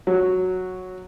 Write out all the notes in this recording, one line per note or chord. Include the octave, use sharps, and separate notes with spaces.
F#3